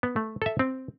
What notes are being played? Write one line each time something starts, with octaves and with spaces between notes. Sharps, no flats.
B3
A3
A4 E5
C4